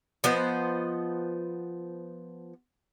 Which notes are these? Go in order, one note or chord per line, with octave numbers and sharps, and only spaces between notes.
F3 B3 C5 D#5